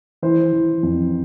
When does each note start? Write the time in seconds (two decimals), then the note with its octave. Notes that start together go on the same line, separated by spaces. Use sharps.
0.23 E3 C5
0.53 E3
0.83 F2